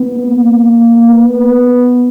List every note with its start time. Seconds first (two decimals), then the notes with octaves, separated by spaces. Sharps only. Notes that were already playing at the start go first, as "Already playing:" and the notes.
Already playing: B3
0.28 A#3
1.10 B3